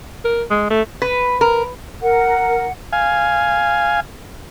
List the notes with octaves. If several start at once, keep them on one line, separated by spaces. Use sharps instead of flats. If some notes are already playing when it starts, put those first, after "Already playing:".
A#4
G#3
A3
B4
A#4
A#4 F#5
F5 G#5